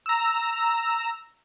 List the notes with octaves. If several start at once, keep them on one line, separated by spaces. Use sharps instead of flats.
A#5 E6